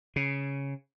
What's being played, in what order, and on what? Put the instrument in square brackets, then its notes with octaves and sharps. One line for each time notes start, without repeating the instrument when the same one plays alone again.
[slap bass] C#3